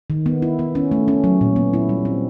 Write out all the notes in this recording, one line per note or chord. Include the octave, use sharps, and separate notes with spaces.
D#3
B3
E4
B3
C#4
A3
C#4
F#3
A#2
B3
E4
G3
C4